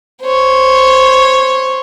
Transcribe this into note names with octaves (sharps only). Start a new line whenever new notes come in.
C5 C#5